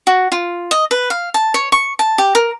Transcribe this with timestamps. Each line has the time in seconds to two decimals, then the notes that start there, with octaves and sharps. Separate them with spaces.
0.07 F#4
0.32 F4
0.71 D#5
0.91 B4
1.10 F5
1.34 A5
1.54 C#5
1.72 C#6
1.99 A5
2.18 G4
2.35 A#4